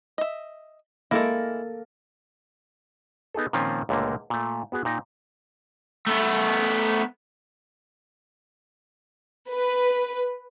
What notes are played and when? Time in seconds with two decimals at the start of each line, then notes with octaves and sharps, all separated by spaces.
0.18 D#5 E5
1.11 G#3 A#3 E4 A4 A#4
3.34 B3 D#4 G#4 A4
3.53 A#2 D#3 F3 C4 C#4 F4
3.89 C#2 A#2 D3 A3 A#3
4.30 A#2 A3
4.72 B3 F#4 G#4 B4
4.85 A#2 D#4 D#5 G5
6.07 A3 B3
9.51 B4